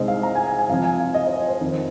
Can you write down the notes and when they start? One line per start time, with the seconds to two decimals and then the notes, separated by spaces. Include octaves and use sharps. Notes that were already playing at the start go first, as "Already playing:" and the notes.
Already playing: C2 C3 G#3 D#4 C5 D#5
0.08 F5
0.23 A#5
0.35 G#5
0.47 G#5
0.59 G#5
0.69 C2 C3 F3 F5
0.84 G#5
1.00 F5
1.14 D#5
1.27 C5
1.37 C5
1.49 C5
1.61 F2 D#3 C4